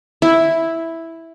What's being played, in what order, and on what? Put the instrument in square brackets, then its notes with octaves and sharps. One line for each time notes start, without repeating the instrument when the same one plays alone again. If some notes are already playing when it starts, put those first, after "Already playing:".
[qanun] E4